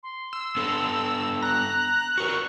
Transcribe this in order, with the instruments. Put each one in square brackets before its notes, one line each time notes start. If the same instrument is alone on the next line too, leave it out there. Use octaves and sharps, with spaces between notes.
[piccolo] C6
[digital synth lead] E6
[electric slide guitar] B3 D4 A4
[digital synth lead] A#5 [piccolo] F#6
[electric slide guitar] F#4 A#4 B4 [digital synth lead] C#6